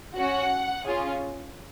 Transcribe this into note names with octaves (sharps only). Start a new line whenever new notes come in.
C#4 F#4 F#5
C#4 F4 G#4